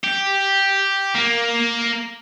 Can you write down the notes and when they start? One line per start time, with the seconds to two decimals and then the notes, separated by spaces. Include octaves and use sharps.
0.04 G4
1.15 A#3